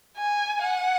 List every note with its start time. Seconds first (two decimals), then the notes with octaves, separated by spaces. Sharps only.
0.17 G#5
0.61 F#5